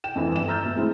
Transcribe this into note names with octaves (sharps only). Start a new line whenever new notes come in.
G5 E7
F2 E3
G1 E7
E5 A#5 E6 F6 G6 A6
B2
G#3 A3 C4 E4